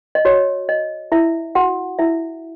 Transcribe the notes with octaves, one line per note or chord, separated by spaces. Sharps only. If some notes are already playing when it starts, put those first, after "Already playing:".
D#5
F#4 C#5
D#5
E4 E5
F#4 F#5
E4 E5